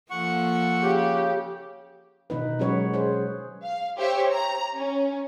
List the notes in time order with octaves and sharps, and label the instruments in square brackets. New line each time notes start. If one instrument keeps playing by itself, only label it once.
[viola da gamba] F3 A#3 A4 [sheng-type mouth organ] F#5 C#6
[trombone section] C#3 [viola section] G4
[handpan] B2 D#3 D#4 B4
F#3 G#3 C#4 F#4 B4 C#5
G#4 C5 C#5
[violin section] F5
G4 C5 C#5 E5
A#5
C#4